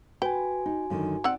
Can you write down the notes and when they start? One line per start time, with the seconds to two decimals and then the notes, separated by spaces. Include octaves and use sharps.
0.22 F#4 B4 G5 G#5
0.66 D#4
0.90 F#2 D3 D#3
1.24 C4 D#4 D5 F#5